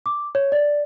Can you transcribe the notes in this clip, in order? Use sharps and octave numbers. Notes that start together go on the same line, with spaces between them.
D6
C#5
D5